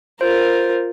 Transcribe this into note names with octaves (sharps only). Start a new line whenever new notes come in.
F4 A#4 C5